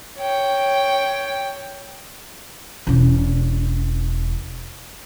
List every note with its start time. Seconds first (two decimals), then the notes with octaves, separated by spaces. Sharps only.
0.18 C#5 G5
2.87 E1 C#4